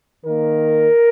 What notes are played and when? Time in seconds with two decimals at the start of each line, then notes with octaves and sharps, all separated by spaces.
0.25 D#3 A#3 A#4